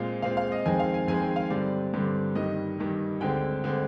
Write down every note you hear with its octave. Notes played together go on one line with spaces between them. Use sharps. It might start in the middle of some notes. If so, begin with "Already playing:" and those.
Already playing: A#2 G#3 C4 F5
A#2 G#3 C4 F5
F5
D#5
F2 D#3 G#3 C4 G#5
F5
G#5
F2 D#3 G#3 C4 G#5
G5
F5
G2 D3 G3 C4 D5
G2 D3 G3 C4
G2 D#3 G3 D#5
G2 D#3 G3
D2 D3 G#3 C4 G5
D3 G#3 C4